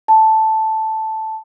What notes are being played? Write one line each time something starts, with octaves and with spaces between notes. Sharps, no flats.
A5